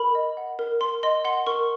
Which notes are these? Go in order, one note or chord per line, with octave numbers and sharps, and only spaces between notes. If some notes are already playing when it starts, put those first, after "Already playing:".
Already playing: A#4 B5
D#5
F#5
A#4
A#4 C6
D#5 C6
F#5 C6
A#4 C#6